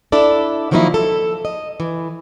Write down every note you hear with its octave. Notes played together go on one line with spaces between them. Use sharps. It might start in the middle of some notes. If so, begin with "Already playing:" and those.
D4 E4 A4 D5
D#3 F3 F#3 A#3 D#4 E4
A4
D#5
E3